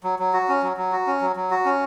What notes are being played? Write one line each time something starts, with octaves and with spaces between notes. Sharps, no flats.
F#3
F#3
F#4
C#4
F#3
F#3
F#4
C#4
F#3
F#3
F#4
C#4